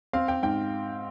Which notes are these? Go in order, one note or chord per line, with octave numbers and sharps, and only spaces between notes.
C4 F5
G5
G#2 G5